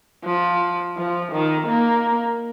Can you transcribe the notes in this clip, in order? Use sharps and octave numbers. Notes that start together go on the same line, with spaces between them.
F3
F3
D#3
A#3